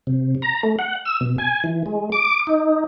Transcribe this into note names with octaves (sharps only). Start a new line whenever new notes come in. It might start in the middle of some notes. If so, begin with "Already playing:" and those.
C3
A#5
A3
F#5
E6
B2
G#5
E3
G#3
D6
D#4